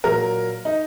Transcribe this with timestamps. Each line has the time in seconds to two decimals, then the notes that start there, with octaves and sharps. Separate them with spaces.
0.04 A#2 F#3 A#4
0.65 D#4